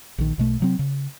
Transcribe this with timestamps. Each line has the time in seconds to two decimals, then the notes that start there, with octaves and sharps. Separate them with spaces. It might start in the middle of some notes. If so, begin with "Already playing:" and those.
0.18 A#1 D#3
0.38 B1 B2 A3
0.60 C3 F#3 C4
0.79 C#3